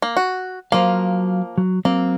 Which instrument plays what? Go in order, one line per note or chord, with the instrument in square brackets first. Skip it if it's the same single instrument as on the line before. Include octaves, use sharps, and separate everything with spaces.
[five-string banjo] A#3
F#4
[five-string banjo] F3 A#3 [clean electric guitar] F#3 F5
[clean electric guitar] F#3
[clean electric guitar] F#3 C4 [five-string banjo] A#3